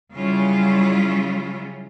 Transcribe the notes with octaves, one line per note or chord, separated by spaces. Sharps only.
C#3 F#3 G3 C#4 E4 F4